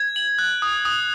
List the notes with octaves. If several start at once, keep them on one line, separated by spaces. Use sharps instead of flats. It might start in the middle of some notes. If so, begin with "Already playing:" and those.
Already playing: G#6
F#7
F#6
D#6
D#6